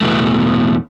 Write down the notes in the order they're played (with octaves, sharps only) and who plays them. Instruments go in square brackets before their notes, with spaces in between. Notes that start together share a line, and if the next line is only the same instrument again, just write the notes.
[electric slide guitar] E2 G#2 B2 E3 A3